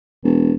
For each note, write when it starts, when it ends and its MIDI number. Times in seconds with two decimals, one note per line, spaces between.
0.24 0.52 28